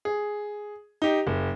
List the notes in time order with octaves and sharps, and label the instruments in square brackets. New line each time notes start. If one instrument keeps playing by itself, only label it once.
[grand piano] G#4
D#4 G4
F#1